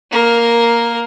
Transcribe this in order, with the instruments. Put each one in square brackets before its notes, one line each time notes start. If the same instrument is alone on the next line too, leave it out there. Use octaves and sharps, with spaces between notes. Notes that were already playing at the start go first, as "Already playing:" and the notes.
[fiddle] A#3 A#4